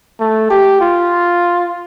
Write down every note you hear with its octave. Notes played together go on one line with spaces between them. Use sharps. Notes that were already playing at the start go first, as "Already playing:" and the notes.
A3
G4
F4